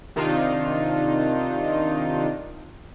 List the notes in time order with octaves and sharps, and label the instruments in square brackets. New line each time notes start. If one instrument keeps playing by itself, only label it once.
[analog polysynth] C3 D#3 D4 D#4 F4